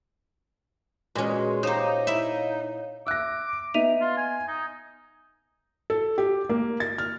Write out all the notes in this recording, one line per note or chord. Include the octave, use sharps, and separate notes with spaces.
A#2 G#3 C#4 F#4 B4 C6
D#4 G4 C5 C#5 F5 A#5
E4 E5
E5 D6 E6 F#6 A#6
B3 D#4 E5 D#7 F7
F4
G#5
D#4
A4
G4
A#3
A6
F6